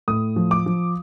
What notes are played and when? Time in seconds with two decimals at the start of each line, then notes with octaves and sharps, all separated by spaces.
0.08 A2 D#6
0.36 F3
0.51 D6
0.66 F3